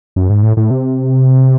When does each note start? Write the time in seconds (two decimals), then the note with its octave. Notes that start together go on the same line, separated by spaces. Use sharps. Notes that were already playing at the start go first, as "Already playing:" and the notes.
0.16 F#2
0.30 G#2
0.43 A2
0.57 A2
0.71 C3